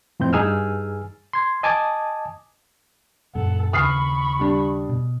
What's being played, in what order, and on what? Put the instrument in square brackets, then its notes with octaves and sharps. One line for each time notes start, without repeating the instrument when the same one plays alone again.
[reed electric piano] F2 A2 C4 G6
G2 D#4 G#4 G#5 E6 F6
C6 G#6
D#5 G#5 A5 D6 D#6 G#6
[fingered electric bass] F#2 A#2 [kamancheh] A4 F#5
[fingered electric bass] D#2 C#3 [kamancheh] B5 C#6 [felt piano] D#6 F6 C7
[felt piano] G3 D4
[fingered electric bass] B2